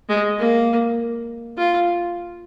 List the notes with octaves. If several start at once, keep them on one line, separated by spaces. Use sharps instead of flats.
G#3
A#3
F4